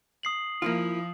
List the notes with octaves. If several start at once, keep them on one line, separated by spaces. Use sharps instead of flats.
D#6 C7 F#7
F3 A#3 E4 F4